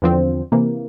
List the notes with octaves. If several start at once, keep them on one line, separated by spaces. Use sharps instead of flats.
E2 D3 F3 C4
C3 E3 A#3